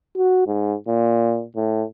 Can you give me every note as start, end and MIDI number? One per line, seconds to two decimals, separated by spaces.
0.17 0.43 66
0.47 0.74 44
0.88 1.44 46
1.56 1.83 45